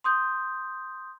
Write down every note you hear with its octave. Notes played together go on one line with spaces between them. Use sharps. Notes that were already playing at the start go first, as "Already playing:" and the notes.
C6 D#6 G6